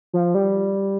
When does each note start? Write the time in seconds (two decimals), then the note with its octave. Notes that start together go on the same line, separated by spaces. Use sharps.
0.13 F3
0.35 G3